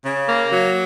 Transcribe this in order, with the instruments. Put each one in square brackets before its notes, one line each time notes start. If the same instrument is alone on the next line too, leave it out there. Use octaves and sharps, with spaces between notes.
[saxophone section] C#3
A#3
F#3